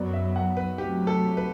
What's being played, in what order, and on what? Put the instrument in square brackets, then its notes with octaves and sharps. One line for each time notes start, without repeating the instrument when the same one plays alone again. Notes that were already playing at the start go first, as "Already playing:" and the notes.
Already playing: [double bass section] F#2 F#3 B3 [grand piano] D5
[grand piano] E5
F#5
B4
[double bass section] C3 F#3 A3 [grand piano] G4
[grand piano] A4
B4